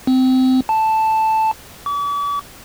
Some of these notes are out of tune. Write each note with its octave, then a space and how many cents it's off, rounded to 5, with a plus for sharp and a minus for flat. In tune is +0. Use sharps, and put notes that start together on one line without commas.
C4 -20
A5 +0
D6 -45